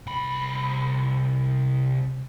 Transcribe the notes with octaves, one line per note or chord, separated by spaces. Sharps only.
C2 B5